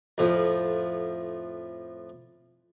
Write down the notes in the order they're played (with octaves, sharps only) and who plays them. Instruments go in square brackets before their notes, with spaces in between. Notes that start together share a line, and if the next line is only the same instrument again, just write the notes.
[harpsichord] F2 A2 F3